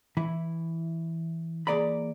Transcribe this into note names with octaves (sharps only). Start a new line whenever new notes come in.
E3 E4
E3 A#3 G#4 D5 A#5 B5